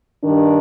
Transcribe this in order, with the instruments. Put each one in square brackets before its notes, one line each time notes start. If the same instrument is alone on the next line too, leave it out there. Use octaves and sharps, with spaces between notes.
[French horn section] G2 D#3 D4